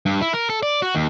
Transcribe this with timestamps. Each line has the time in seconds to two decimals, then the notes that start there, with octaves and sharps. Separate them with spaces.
0.06 G2
0.21 E4
0.33 A#4
0.50 A4
0.63 D5
0.82 F#4
0.95 D#2